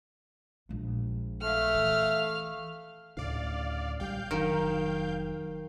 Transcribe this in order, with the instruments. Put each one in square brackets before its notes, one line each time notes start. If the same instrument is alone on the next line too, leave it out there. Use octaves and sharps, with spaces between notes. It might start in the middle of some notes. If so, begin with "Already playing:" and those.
[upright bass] A#1 G#3
[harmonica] A3 [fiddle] F5 F6
[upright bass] E3
[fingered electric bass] D2 A2 C#3 [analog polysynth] D5 F5
[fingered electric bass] A#1 G3 G#3 [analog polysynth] F5 G5 G6
[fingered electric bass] F1 F#3 [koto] D#3